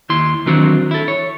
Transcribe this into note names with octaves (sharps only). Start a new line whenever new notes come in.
D#2 E4 C6
D#3 E3 F#3 C4 D4 F#4
E4 A4
C#5